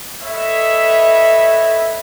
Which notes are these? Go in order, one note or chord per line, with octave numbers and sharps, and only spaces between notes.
A4 B4 C#5 D#5 E5